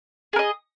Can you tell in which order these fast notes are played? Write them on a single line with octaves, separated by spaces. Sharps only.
G#4 A#4 D#5